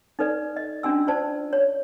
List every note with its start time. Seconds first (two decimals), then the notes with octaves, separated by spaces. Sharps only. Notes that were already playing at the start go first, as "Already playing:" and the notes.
0.19 D#4 A4 B4 D5
0.56 D#5
0.83 C#4 D4 F#4 G#5 E6
1.07 F4 B4 C5 D5 A5
1.53 C#5